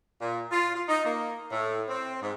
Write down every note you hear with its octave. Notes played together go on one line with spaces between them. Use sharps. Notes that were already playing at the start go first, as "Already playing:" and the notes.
A#2
F4
F4
D#4
A#3
A2
C4
G#2